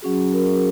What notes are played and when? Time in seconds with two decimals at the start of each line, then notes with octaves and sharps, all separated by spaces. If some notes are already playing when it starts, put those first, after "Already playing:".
0.02 F#3 C#4 F#4 G#4
0.33 A#4
0.54 G#4